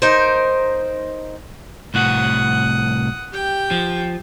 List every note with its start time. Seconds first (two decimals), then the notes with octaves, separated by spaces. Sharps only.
0.02 D#4 A#4 C5
1.94 C2 A2 F#4 F#5 D#6
3.32 G4 G5
3.71 F3